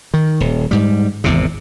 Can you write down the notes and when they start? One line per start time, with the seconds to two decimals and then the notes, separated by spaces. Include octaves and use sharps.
0.14 D#3
0.40 D#1
0.71 G#2 G3
1.24 G#1 E2 C3